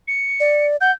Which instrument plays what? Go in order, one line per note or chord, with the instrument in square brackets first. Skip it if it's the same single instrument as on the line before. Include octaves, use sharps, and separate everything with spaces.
[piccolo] C#7
[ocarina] D5
[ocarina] F#5 [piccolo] G6